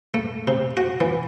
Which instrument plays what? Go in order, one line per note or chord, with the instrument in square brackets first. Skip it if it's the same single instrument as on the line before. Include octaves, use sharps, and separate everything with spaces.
[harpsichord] A3
C3
F#4
E3